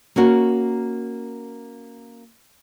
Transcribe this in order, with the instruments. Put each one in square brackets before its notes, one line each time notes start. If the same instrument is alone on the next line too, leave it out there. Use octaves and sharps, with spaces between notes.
[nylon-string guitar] A#3 C#4 F#4 A#4